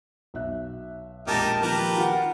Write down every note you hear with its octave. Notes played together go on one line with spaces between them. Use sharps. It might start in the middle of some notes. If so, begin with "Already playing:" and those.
B1 E5 F#6
A#1 G#3 D#4 G4 A#4 A5 A6
D#3 F3 A#3 G4 A#4 B4
D#3 F4 F#5